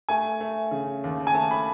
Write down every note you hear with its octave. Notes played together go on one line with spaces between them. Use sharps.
A3 G#5
A3
C#3
D#2
G#5
A3 A5
B5